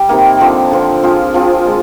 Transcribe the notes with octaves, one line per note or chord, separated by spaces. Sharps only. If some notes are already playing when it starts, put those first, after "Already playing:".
Already playing: G3 G4
C3 D#3 A#3
D3 F3 C4
D3 F3 C4
F3 C4 F4 G#4
F3 C4 F4 G#4
G#3